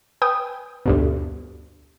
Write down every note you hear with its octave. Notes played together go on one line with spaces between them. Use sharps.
B4 G5 G#5 D#6
D2 G2 B2